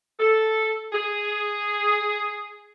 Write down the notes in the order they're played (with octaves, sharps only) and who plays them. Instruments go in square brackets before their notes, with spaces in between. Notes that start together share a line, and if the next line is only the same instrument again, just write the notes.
[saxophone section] A4
G#4